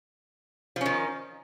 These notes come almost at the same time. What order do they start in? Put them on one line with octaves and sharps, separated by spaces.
F3 C#4 D#3